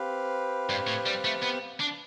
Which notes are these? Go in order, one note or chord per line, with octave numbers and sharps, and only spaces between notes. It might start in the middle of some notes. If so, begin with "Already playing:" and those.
Already playing: C4 G4 B4 F5
G2
A2
G3
A3
B3
D4